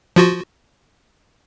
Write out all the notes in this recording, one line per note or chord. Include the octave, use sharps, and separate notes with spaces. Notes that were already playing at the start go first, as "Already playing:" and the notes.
F3 F4 F#4